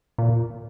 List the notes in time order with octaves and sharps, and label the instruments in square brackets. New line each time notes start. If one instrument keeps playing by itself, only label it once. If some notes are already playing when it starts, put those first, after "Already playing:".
[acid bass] A#2